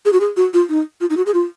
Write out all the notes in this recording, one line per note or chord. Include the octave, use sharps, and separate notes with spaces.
G#4
F#4
G#4
F#4
F4
D#4
F4
D#4
F#4
G#4
F4